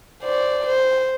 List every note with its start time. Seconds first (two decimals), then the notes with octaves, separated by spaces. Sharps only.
0.22 C5 D5
0.67 C5